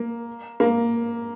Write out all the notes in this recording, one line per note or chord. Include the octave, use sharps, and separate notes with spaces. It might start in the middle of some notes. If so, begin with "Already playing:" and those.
Already playing: A#3
A#3